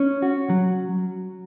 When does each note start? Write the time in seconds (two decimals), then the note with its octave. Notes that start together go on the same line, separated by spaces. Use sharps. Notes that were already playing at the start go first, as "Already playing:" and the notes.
Already playing: C#4
0.22 F#4
0.50 F#3